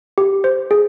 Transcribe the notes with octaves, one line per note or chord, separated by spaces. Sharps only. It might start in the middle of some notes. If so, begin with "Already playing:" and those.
G4
C5
G#4